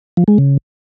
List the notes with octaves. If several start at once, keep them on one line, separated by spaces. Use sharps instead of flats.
F3
G#3
C#3